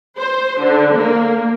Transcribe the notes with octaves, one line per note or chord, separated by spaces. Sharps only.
C5
D3
A#3